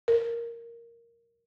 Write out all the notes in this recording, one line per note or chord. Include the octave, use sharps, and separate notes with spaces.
A#4